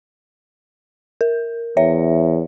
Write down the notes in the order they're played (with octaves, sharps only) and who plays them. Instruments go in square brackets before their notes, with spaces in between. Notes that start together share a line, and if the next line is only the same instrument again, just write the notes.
[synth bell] A#4
[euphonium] E2 [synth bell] C#5 E5